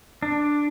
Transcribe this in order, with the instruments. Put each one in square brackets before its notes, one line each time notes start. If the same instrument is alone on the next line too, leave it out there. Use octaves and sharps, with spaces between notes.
[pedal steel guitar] D4